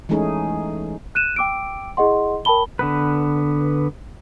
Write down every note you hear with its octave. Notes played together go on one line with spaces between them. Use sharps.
E3 G#3 A3 C#4 D#4 G#4
F#6 D#7 E7
G5 D6 E6 D7
E4 G#4 D#5 F#5 C6
A#4 G5 A5 B5 G7
D3 B3 B4